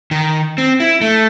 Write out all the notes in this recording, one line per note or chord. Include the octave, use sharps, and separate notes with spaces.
D#3
C4
E4
A3